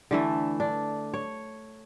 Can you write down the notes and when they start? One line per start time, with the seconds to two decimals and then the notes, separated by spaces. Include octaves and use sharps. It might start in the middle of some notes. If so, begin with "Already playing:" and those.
0.11 D3 E3 A3
0.60 D4
1.14 C#5